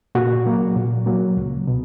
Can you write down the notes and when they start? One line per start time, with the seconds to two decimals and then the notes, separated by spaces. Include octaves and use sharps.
0.15 A#2 F#4
0.46 F#3 A#3
0.76 A#2
1.06 F#3 A#3
1.37 C#2
1.67 B2